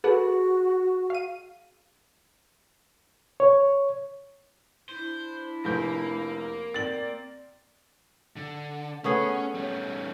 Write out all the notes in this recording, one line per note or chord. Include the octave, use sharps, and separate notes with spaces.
F#4 G#4 A4 B4 F#5
F5 D#7
C#5
D4 E4 C5
F1 A#3 G6
C4 D5 A6 F#7
D3
A3 B3 C#4 G#4
G3 C#4